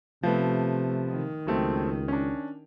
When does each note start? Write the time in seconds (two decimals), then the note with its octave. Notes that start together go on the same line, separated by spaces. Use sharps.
0.23 C3 F3 A3 B3
1.09 D#3
1.47 C#2 F#3 A3 C4
2.08 C#4 D4